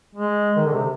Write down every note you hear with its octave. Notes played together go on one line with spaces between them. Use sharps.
G#3
D#3
D3
C3